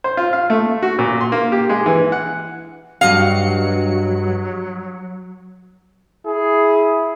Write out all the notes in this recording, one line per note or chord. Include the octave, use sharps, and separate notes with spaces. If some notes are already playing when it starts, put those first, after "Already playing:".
C5
F4
F5
A3
F#4
A#2
C6
A#3
G4
G#3
E3
F#5
G2 F#3 F#4 D#5 F5 C#7
E4 G#4